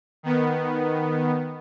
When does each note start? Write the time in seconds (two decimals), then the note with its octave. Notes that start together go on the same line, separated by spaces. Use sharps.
0.23 D#3 B3